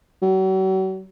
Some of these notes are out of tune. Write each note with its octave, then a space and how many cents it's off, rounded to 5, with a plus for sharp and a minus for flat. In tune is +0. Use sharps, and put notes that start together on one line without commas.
F#3 +40